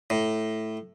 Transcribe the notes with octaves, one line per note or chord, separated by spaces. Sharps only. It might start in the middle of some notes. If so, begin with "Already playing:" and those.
A2